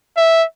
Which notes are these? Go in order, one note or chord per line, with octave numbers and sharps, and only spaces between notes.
E5